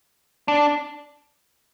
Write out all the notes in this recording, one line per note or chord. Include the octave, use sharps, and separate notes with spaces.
D4